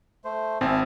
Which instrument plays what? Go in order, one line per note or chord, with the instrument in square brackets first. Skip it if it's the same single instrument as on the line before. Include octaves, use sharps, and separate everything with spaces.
[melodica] A3 C5
[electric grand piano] G#1 C4 [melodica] E4 G#5 A5